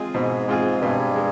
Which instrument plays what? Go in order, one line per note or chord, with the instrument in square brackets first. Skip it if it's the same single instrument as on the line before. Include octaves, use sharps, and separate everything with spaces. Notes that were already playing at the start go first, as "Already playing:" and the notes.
Already playing: [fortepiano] G#3 C4 F4 G#4
[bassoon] G#2 [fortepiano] B2
[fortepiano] G#3 C4 F4 G#4
[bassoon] G2 [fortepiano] B2
[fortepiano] G#3